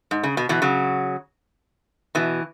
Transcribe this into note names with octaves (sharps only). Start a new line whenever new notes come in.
G#2
C#3
B2
B2 E3
C#3 F#3
B2 E3